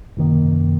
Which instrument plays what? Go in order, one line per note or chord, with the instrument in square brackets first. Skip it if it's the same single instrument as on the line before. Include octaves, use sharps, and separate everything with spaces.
[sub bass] F#2 [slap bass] C3 D#3 A#3